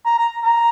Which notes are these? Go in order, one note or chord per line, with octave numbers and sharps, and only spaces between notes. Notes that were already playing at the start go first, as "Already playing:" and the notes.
A#5
A#5
A#5